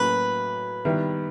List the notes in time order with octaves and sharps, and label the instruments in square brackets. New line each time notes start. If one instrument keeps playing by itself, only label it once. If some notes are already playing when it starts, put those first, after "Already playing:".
Already playing: [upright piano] A2 F#3 A#3 C#4 [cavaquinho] B4
[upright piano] D#3 G3 B3 E4